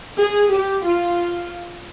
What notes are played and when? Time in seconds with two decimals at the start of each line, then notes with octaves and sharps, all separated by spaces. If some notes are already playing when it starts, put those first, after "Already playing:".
0.19 G#4
0.53 G4
0.86 F4